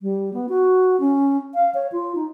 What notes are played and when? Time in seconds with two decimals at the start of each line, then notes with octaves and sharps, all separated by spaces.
0.02 G3
0.34 B3
0.49 F#4
1.00 C#4
1.55 F5
1.75 C#5
1.92 F4
2.15 D#4